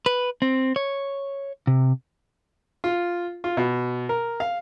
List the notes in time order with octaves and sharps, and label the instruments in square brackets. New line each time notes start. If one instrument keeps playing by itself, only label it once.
[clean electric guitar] B4
C4
C#5
C3
[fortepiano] F4
F4
B2
A#4
F5